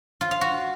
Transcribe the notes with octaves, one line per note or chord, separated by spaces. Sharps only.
F4
F5
F#4